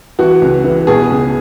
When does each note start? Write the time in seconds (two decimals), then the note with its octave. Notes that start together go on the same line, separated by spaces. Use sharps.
0.19 E3 F#4
0.42 C#2
0.64 E3
0.87 B2 G#4
1.10 C#2